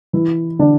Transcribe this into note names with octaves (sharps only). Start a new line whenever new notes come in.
E3 E4
D3 D4